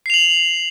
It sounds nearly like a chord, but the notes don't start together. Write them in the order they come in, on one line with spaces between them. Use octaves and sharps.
C7 F7 F#7